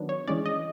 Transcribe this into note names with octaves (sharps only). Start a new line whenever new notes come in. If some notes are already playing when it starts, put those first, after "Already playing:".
Already playing: D#3 F#3 B3 D4
C#5
E3 G#3 C#4 D5
D#5